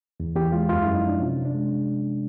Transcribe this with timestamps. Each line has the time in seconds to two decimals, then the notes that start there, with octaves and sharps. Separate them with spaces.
0.20 E2
0.35 E2 G4
0.52 G#3 F4
0.69 F#2 F4
0.82 F#2 E4
0.95 D#4
1.03 F3 D4
1.20 C3 C#4
1.37 C3
1.45 D4
1.54 G#3